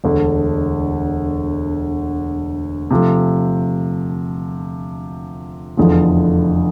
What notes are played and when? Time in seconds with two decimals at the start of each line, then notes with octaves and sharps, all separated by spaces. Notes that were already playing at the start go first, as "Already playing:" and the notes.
0.04 E1 D2 D3
2.90 C3 F3 A3
5.77 F1 E2 D3 F3